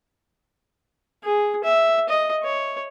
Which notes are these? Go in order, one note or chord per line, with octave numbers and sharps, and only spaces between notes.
G#4
E5
D#5
C#5